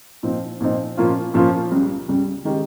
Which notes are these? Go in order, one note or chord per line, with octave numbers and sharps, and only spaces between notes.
A#2 F3 C4 D#4
A#2 F3 C4 D#4
A#2 F3 A#3 C#4 F4
A#2 F3 A#3 C#4 F4
C#2 C#3 G3
C#2 C#3 G3
D#3 G#3 C#4 G4